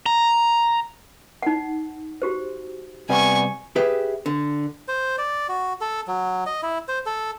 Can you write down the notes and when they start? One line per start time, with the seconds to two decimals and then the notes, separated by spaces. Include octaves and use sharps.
0.06 A#5
1.42 D#4 F#5
2.22 F#4 G4 C5
3.09 C3 G3 B3 G#5 C#6
3.76 G4 G#4 B4 E5
4.26 D3
4.88 C5
5.18 D5
5.49 F#4
5.81 A4
6.07 F#3
6.46 D#5
6.63 E4
6.88 C5
7.06 A4